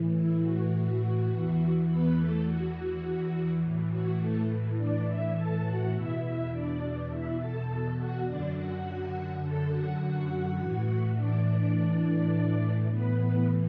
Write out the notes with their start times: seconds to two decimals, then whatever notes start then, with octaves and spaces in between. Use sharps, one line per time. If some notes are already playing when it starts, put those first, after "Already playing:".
Already playing: A2 E3
0.13 E4
0.42 F#4
1.29 E2 E3
1.87 B3 B4
2.16 A3 A4
2.44 F#4
3.60 A2
3.66 E3
3.90 F#4
4.19 A3 A4
4.77 D4 D5
5.06 E4 E5
5.35 A4 A5
5.64 F#4 F#5
5.93 E2 B2 E4 E5
6.22 E4 E5
6.52 D4 D5
7.09 E4 E5
7.39 A4 A5
7.67 A4 A5
7.96 F#4 F#5
8.25 F#2 D3 D4 D5
8.54 F#4 F#5
9.42 A4 A5
9.70 F#4 F#5
9.99 F#4 F#5
10.58 A2 E3
11.16 D4 D5
12.89 A2 E3 B3 B4